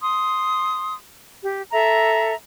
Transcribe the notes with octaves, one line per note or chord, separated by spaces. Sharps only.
C6 D#6
G4
A4 E5 A#5